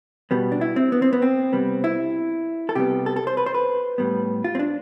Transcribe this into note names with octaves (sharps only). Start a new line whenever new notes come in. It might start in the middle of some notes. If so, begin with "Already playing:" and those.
B2 G3 B3
D4
E4
C4
B3
C4
B3
C4
C3 G3 B3
E4
A4
C3 G3 B3 G4
A4
A4
C5
B4
C5
B4
A2 G3 B3
F4
C4
D4